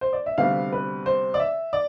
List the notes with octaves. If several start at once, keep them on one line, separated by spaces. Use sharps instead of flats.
C5
D5
E5
D2 C3 G3 B3 F5
B4
C5
D5
E5
D5